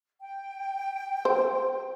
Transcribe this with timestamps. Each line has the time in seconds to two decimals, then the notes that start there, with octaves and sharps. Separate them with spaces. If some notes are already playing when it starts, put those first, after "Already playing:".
0.21 G5
1.25 C5